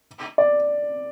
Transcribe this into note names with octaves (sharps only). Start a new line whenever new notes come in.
D5